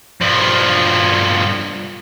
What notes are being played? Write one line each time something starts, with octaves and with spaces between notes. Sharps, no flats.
G2 F3